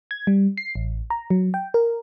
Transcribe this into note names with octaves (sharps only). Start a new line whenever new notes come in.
G#6
G3
C7
A1
A#5
F#3
G5
A#4